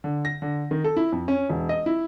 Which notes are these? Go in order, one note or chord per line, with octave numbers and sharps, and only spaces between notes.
D3
A#6
D3
D#3
A4
E4
F2
C#4
E1
D#5
E4